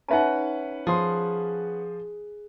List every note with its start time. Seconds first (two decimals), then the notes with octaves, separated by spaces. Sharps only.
0.08 C#4 D#4 B4 E5 F#5 A#5
0.87 F3 G#4 C6